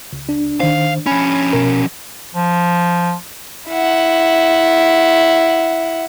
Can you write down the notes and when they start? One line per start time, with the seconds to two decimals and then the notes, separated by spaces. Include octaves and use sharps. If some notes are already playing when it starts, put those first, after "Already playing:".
0.13 C#2
0.29 D4
0.60 D#3 D4 C5 F5
1.07 F3 C#4 B5
1.53 B2 A#4
2.35 F3
3.69 E4 F#5